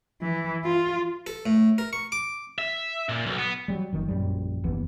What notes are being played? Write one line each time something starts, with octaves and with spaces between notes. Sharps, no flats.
E3
F4
A4
A2
A#4
C#6
D6
E5
A#2
B1
B3
F#3 G3
F#1 D#3
A#1 F#2 F#3 G3
F#1 D#2 E3 B3